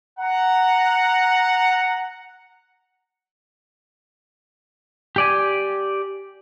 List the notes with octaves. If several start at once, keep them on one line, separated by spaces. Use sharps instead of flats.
F#5 A#5
G4 D5 G#5